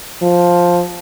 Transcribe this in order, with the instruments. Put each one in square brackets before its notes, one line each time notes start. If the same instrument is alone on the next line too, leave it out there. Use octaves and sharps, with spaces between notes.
[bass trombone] F3